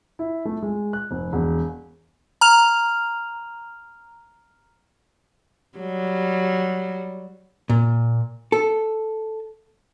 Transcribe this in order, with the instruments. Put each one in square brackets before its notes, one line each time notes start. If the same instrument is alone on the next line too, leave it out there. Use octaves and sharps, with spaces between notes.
[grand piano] E4
A3
G#3
F#6
F1
E1
[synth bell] A#5 F6 F7
[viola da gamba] F#3 G3
[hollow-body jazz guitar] A#2
A4